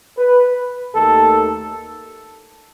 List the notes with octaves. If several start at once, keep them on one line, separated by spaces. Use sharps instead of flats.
B4
D#2 D#3 A3 A4